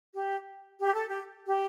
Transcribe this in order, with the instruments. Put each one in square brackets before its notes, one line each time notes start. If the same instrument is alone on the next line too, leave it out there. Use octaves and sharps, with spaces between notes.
[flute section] G4
G4
A4
G4
G4